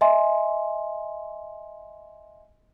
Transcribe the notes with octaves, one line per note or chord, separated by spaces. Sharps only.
D#5 E5 G#5 C6